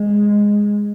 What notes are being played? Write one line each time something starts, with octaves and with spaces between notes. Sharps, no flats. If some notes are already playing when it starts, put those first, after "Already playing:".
Already playing: G#3